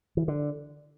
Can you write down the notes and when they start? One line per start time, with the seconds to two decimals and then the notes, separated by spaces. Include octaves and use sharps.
0.17 E3
0.28 D3